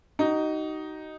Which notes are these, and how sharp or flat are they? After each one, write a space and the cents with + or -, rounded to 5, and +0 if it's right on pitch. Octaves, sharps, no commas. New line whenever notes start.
D#4 +0 F#4 +40